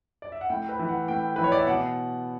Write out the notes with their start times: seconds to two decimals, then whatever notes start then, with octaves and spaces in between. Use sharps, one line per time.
0.22 D5
0.32 E5
0.41 F#5
0.50 A2 G5
0.69 B4
0.79 E3
0.89 F#5
1.08 A2 G5
1.36 E3 B4
1.44 C#5
1.52 D5
1.59 E5
1.67 B2 F#5